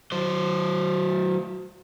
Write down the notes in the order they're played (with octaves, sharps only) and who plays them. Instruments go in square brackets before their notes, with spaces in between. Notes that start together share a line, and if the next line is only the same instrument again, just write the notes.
[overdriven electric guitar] F#3 C5